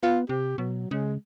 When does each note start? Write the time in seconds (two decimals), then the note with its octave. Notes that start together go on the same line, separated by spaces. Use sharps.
0.03 B3 F4
0.29 C3 G4
0.58 B2 F#3
0.91 C#3 G#3